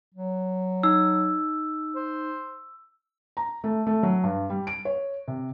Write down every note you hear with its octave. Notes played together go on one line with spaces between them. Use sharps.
F#3
D#4 E6
C5
A#5
A3
A3
F#3
G2
G3
D7
C#5
C3